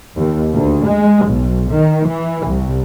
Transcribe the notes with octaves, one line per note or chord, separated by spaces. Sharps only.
D#2
D2
G#3
B1
D#3
E3
C2